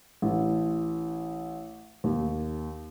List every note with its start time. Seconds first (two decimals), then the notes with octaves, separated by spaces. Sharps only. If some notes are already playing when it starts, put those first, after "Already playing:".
0.22 A1
2.04 D#2